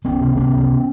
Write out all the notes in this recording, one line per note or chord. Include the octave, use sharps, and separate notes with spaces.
C#2 B3 C#4
C3
C3 B3 C#4
C#2